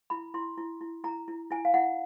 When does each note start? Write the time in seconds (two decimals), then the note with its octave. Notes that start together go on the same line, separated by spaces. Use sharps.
0.10 E4 B5
0.34 E4 C6
0.58 E4
0.81 E4
1.04 E4 A#5
1.28 E4
1.50 E4 G#5
1.65 F5
1.74 E4 F#5